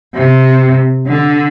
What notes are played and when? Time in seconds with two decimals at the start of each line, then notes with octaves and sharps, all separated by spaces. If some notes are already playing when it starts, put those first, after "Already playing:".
0.15 C3
1.07 D3